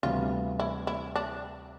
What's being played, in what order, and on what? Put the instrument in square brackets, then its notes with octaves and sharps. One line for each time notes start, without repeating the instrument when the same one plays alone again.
[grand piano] D2 C3 E3 G3 B3 [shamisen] F4
[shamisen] E4
E4
D4